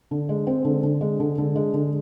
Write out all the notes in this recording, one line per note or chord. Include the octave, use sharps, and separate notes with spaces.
D3
G#3
C4
D3
D3
G#3
D3
D3
G#3
D3